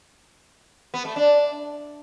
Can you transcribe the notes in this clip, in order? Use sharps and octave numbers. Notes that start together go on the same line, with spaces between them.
B3
A3
D4